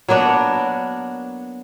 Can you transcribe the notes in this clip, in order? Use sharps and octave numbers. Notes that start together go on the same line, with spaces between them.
F#3 A#3 B3 D4